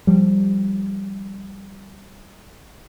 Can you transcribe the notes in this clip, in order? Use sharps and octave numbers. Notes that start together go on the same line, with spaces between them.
F3 G3